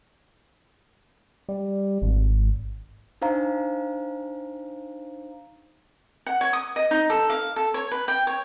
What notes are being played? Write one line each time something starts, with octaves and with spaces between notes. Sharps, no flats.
G3
G#1
D4 D#4 C5 F5 A#5
F#5
C#5
D#6
D#5
D#4
A4
F5
A4
C#5
B4
G5
C#5